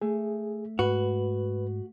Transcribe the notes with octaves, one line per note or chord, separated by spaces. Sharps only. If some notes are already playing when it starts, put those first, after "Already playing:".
A3 G#4
G#2 F#4 B4